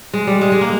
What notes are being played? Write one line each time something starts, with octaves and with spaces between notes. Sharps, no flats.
G#3
G3
G#3
G#3
A#3